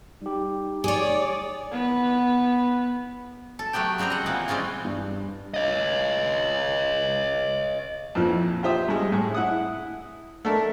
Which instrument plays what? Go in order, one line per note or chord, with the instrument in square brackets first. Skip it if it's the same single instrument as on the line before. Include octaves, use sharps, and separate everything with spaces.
[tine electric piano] G3 G4 [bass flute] D#4
[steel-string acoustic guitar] G#4 C#5 [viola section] D5
[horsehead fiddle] B3 B4
[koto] A4
F#3 A3 B3 G4 G5
C#3 G3 C4 C5 A#5
D#5 F#5
A#2 E3 B3
G3 G#3 C4 C#4 F4
[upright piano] G2
[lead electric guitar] C#5 D#5
[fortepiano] F2 A#2 E3 F3
F4 G4 C5 E5 D#6
G2 G#3
A2 G#4
E4 F#5 D#6
A3 D4 A4 A#4